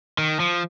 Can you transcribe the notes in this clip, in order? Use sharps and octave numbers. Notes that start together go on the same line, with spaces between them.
D#3
F3